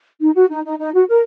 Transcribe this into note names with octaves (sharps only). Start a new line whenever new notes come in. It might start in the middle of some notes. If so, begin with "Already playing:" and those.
D#4
F#4
D#4
D#4
D#4
F#4
A#4